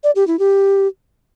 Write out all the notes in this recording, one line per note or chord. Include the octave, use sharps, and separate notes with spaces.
D5
G4
E4
G4